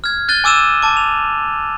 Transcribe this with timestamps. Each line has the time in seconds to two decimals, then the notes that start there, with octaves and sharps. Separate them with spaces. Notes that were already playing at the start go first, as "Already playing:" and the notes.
0.04 F6 G#6
0.28 F6 F#6 A6 D#7 G7
0.44 G#5 D6 E6 D#7 E7
0.82 A5 D6
0.97 F7